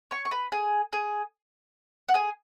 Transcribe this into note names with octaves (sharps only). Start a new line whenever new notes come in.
C#5 C#6
C#6
B4 B5
G#4 G#5
G#4 G#5
F#5
G#4 G#5